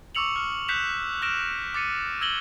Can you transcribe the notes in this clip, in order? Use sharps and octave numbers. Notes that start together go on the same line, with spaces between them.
C#6 D6 E6 C#7 F7 F#7
F6
F#6 G6 B6 C#7 E7 F7
C#6 F6 A#6 D7 E7
D6 A6 C#7 D#7
E6 G#6 A#6 F#7 G7